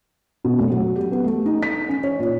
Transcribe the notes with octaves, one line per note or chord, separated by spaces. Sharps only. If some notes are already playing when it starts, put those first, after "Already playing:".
B2
F1
F#3
G4
B3
A3
D#4
B6
C#4
C#5
A#2